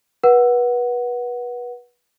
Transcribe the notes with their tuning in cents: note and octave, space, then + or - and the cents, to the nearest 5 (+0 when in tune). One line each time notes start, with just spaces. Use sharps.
B4 -25 F#5 +0